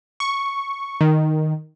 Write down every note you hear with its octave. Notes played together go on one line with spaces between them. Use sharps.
C#6
D#3